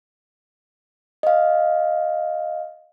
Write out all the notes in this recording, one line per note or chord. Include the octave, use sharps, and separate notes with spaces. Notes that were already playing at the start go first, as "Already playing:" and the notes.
D#5 F5